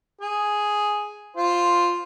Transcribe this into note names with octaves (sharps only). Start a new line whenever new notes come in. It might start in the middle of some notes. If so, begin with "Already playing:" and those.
G#4
F4 C5